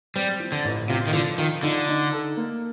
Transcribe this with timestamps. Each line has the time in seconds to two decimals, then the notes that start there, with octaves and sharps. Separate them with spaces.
0.16 G3 C4
0.40 F3
0.52 D3
0.65 A1
0.89 C3 F4
1.07 D#3
1.13 D3 F3
1.38 D#3 F4
1.63 D3 D#4
1.88 D#4
2.13 A4
2.37 A#3